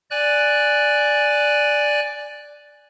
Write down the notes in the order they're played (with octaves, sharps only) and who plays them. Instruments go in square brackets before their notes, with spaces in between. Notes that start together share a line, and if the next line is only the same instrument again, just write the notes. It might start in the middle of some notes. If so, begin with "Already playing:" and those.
[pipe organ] D5 G#5 F#6